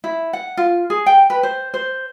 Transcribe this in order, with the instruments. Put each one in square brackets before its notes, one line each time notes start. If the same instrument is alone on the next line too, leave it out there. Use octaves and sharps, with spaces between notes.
[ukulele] E4
F#5
F4
G#4
G5
B4
C5
C5